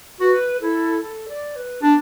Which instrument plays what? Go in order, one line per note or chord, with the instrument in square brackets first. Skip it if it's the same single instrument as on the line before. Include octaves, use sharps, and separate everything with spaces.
[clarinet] F#4 [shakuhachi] B4
[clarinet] E4 [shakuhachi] A4
[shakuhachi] A4
D5
B4
[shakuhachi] B3 [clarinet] D4